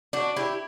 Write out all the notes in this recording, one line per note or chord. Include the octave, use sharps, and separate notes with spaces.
D4 F#4
E4 G4